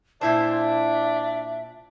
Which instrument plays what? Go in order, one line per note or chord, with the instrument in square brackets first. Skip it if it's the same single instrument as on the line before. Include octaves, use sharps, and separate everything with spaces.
[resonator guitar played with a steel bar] A#2 E4 C5 [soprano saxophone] D4 [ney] E5 [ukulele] A5